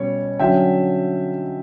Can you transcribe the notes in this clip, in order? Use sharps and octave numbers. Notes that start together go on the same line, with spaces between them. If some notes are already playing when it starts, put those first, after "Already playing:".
Already playing: B2 G3 C#4 C#5
D3 F#3 C#4 E5 G5